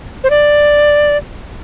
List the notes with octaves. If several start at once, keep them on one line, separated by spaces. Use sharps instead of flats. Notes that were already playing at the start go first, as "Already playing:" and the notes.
C5
D5